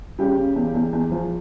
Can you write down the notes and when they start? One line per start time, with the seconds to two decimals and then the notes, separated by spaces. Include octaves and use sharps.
0.19 C#3 G3 G4
0.37 C#3
0.56 E2
0.74 E2
0.93 E2
1.11 F3